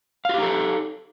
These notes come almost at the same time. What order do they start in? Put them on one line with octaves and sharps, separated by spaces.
F5 F#4 G4 D#4 A4